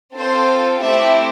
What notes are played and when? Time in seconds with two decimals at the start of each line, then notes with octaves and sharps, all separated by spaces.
0.16 C4 F4 A4 C5
0.83 A3 C4 E4 G4 E5